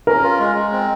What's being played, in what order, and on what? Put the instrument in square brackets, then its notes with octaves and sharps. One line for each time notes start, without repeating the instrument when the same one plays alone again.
[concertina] C#4 [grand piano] A#4
[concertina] F4
G#3
G#3
C4